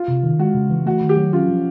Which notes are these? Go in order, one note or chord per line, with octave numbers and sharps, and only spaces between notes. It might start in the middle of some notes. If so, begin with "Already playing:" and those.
Already playing: F4
C3
D#3
G#3 F#4
C#3
E3
A3 F#4
D#3
G4
F#3
C#4 F4
F3